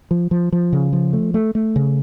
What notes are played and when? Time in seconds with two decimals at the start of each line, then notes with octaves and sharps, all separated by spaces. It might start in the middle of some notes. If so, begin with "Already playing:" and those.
0.11 F3
0.31 F3
0.52 F3
0.73 C#3
0.93 F3
1.13 A3
1.34 A3
1.55 A3
1.76 C#3